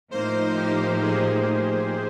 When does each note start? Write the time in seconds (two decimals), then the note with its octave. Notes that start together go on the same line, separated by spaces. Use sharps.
0.11 A2 F3 A#3 D#4 C5
0.57 G4
1.03 G#4